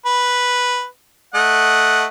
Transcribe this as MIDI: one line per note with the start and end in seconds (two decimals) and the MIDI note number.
0.06 0.85 71
1.35 2.05 57
1.35 2.05 75
1.35 2.05 78